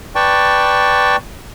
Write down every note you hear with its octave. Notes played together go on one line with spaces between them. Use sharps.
B4 D5 G5 A5 C#6